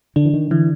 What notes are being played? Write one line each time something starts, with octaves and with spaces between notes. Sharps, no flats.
D3 D4
E3
D#3
D3 E3